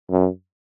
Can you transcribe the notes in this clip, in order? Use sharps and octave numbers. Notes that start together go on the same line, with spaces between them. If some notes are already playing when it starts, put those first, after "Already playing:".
F#2